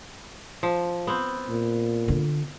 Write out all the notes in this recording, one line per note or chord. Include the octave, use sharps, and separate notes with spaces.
F3
B3 C4
A#2
D3 F4